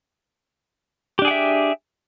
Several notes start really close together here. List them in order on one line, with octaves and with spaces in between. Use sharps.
G4 D4 G#4 G5 E5